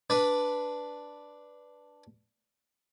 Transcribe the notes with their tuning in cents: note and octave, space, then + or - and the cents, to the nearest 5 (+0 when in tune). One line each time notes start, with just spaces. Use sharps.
D4 +0 B4 +0